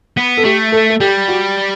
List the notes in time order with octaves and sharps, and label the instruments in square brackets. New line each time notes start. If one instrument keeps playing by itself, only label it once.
[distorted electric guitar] B3
[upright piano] A4
[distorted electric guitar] A3 [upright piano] G4
[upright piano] A4
A4
[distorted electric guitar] G3 [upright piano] G4
[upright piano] F#4